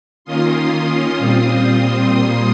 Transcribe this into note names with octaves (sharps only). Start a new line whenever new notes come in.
D#3 A#3 C#4 F4 C6 D#6
A#2 G3 C4 F4
A#2 G3 A#3 C6 D#6